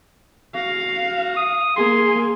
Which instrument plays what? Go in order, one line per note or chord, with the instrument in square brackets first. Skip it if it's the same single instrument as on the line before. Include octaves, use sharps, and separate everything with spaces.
[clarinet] F#4 [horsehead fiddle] F5
[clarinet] D#6
[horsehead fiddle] A#3 G#4 [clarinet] C6